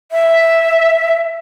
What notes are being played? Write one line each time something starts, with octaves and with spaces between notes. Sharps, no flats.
E5